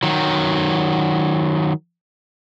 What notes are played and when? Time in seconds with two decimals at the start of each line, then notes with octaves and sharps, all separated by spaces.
0.03 D#3 F#3